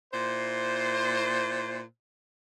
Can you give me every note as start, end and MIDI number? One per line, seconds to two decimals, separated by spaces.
0.14 1.82 46
0.14 1.82 64
0.14 1.82 72